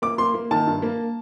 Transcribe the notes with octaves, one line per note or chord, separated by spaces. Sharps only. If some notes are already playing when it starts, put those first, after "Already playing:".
A#3 D6
A#3 C6
A#3
D#3 A5
G2
A#3